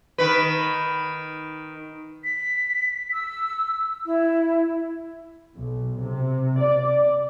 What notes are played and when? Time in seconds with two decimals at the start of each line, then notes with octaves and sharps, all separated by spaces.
0.18 D#3 B4
2.24 B6
3.13 E6
4.06 E4
5.58 B1
6.00 C3
6.60 D5